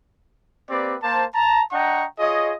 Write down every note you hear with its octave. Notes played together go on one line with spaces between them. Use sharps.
A#3 C4 G4 B4 D5
A#3 C5 A5
A5 A#5
D4 D#5 F#5 G5 A#5 C#6
F4 G#4 C#5 D#5